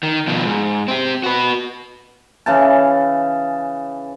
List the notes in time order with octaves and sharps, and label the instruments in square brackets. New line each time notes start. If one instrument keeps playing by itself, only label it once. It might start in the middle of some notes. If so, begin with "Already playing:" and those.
[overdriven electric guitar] D#3
B2 F3
G#2
C4 G4
F#4 B4
[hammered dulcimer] C#3 E3 A5